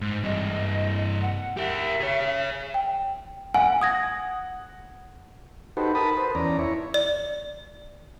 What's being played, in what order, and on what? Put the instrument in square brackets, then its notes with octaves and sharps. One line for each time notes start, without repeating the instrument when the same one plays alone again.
[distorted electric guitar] G#2
[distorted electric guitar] G2 C3 [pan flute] D#5
[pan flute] F#5
[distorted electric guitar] G4 A#4 [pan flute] E5
[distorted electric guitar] G#4 C#5
[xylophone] G5
[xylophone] F5 G#5 [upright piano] F#5
[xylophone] D#6 G#6 A#6
[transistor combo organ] D#4 F#4 G4 A4 B4 C5
A#4 A5 B5 D#6
B4 C5
E2 C#4 D5 A#5
E4 C#5
[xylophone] D5